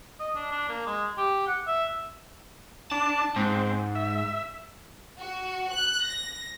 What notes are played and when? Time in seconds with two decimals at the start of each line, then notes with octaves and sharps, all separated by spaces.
0.20 D#5
0.36 D4
0.52 D4
0.69 A#3
0.86 G#3
1.18 G4
1.47 F#5
1.67 E5
2.92 D4 A5
3.36 G#2 C4
3.95 E5
5.19 F#4
5.70 F#6
6.07 A#6